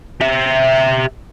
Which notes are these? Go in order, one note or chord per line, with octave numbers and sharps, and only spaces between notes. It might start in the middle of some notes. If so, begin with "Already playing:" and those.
G4 E5